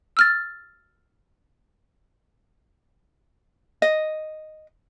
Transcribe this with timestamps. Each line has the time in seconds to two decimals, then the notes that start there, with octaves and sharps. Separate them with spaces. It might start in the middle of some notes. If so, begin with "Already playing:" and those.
0.17 E6 F6 A6
3.82 D#5